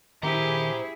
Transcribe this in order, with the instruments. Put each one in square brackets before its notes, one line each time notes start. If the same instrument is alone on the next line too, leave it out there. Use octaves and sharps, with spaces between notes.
[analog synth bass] D#3 [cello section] E4 G#4 [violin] G4 [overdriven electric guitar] C5 A#5